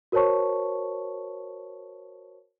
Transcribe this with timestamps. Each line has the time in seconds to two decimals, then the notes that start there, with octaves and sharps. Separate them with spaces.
0.12 F#4 A#4 C5 C#5 A5 C#6